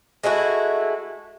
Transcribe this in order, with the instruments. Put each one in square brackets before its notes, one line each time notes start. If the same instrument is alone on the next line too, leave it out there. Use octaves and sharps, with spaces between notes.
[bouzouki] G#3 A3 E4 F#4